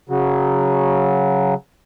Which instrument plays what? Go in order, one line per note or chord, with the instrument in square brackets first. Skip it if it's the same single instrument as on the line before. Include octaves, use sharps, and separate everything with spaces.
[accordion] C#3 F#3